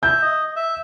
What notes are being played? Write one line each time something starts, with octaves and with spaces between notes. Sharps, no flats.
E5 G6
D#5
E5